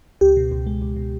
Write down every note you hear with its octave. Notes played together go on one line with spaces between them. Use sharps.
C#2 G4
B2
C#2
G#3
C#2
B2